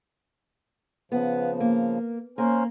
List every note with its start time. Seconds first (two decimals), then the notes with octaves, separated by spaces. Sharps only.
1.12 C#3 F3 B3
1.60 A#3
2.38 A#3 C#4 A#4 C5